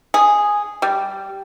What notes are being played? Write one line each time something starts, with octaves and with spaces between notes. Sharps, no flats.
G#4
G3